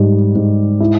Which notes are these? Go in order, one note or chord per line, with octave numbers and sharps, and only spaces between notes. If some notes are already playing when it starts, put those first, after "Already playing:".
Already playing: G#2 G3
G#2
E4